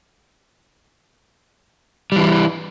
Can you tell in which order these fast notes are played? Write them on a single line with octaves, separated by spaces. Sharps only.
G3 E3 E4